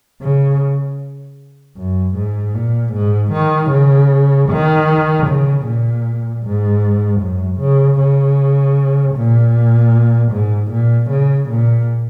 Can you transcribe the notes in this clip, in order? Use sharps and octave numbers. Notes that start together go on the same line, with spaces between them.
C#3
F#2
G#2
A#2
G#2
D#3
C#3
D#3
C#3
A#2
G#2
F#2
C#3
C#3
A#2
G#2
A#2
C#3
A#2